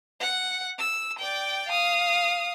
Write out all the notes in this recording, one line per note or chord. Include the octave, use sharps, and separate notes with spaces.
F#5
E6
D5 G5
F5 D#6